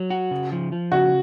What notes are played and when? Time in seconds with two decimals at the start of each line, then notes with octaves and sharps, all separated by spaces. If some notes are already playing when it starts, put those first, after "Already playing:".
Already playing: F#3
0.10 F#4
0.31 C#3
0.52 F3
0.72 F3
0.92 C#3 F#4